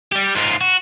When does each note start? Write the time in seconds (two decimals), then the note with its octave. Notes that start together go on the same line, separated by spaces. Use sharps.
0.12 G3 G4
0.35 G#2 F4
0.61 F#4